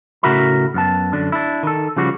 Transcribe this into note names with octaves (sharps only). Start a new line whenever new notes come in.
A2 C#3 F#4 A#4 E5 B5
F#2 B3 A5
F#2 D3 D4
D4 E4
D#3 A4
C#3 F3 G3 F#4